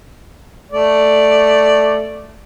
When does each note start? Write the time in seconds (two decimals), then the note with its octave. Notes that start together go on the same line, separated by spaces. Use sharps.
0.71 A3 D5